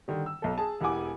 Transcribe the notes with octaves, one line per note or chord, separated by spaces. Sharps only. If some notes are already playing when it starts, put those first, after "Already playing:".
D3 D#3 G3
E6
B1 A4
G#4 A5
E1 E3 G4 F#5 G#5 D6